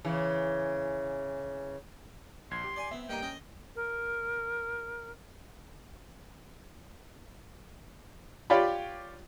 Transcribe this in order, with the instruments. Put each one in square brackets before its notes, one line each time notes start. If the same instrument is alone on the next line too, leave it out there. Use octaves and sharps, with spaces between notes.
[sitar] C#3 E3
[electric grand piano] A#1 G#6 [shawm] C6
[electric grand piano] G4
[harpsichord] D5 G#5
[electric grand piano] B3 E5 [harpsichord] C4
[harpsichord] G2 D#4 D#5 [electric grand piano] A#3 A#5 [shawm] G5
[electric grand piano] C#4 [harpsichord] A#4 D#5
[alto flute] A#4
[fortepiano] F4 G4 C#5 D5 B5